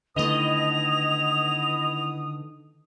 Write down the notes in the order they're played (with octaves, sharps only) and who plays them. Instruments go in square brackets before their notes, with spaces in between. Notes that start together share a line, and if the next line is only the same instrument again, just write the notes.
[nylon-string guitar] D3 D#3 A3 [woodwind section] B3 E4 D#6 [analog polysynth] D#5 [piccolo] F7